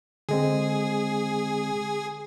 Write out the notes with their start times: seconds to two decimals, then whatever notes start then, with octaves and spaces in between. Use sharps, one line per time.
0.29 D3 G#3 C4 G#4